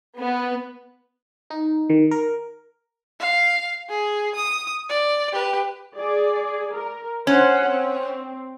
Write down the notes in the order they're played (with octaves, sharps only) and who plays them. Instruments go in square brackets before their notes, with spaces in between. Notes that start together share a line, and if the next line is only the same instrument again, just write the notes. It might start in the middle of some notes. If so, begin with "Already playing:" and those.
[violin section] B3
[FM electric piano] D#4
D#3
A#4
[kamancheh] F5
G#4
D#6
D5
G4 B4
[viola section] G#4 D5
A#4
[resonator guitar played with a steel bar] C#4 [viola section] C5 F#5
[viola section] C4